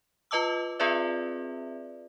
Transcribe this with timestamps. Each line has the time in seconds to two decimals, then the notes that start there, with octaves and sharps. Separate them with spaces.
0.31 F4 B4 D#5 A5 D6 E6
0.80 C4 F4 G#4 B4 D5 E5